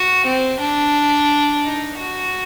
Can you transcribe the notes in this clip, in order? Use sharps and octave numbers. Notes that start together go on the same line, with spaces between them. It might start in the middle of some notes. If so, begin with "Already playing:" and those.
Already playing: F#4
C4
D4
D#4
F#4